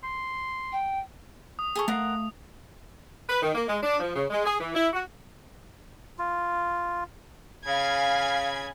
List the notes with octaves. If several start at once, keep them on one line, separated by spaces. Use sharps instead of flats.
C6
G5
D#6
G#4 A4 C#6
A3 A#4 D#5 F5 F#5
B4
D#3
A#3
G#3
D4
F3
C#3
G#3
G#4
E3
E4
F#4
F4
C#3 F5 G#5 B5 G#6